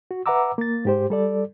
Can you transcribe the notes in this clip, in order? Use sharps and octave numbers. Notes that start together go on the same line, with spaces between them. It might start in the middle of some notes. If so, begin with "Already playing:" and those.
F#4
B4 E5 F#5 A#5 D6 E6
A#3 A6
G#2 G4 C5
G3 A4 D5